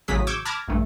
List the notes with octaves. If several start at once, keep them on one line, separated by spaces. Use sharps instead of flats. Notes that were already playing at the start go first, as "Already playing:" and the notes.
A1 C#3 F#3 G#4 D#6 B6
C#6 D6 E6 G6 G#6
A5 B5 D6 F6 G#6 A#6
A#1 G2 A3